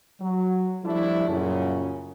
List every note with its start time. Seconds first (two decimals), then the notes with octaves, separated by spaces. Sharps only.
0.21 F#3
0.84 F3 G3 A3 D4 E4
1.28 F#2 A#2 C#3